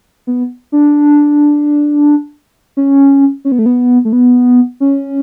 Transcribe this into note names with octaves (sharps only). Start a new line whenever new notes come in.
B3
D4
C#4
C#4
B3
A3
B3
A3
B3
C#4